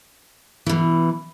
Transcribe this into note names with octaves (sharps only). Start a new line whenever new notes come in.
B2 E3